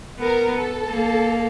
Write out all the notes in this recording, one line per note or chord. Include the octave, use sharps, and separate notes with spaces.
B3 A#4
A4
A#3